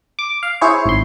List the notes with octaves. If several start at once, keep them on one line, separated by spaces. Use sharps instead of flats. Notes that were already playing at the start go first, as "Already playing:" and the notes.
D6
F5
E4 G#4 C5 C#5
G#1 C6